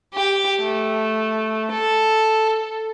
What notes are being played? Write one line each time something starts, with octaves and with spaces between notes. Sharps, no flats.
G4
A3
A4